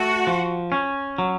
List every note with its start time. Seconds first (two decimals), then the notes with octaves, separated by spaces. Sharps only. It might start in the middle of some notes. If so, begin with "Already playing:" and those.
Already playing: A3 F#4
0.27 F3
0.72 C#4
1.18 F#3